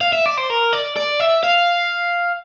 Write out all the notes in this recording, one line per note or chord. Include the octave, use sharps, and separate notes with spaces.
F5
E5
D5
C5
A#4
D5
D5
E5
F5